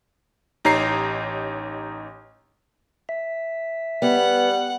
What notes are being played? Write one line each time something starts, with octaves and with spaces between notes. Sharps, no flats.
A1 D#4 G4 C#5 A#5 C7
E5
G3 B3 F#5